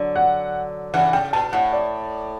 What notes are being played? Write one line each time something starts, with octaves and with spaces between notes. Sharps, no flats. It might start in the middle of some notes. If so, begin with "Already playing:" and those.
Already playing: D3 F#3
F#5
C#3 E3 F#5
C#3 G5
B2 A5
A2 F#5
D5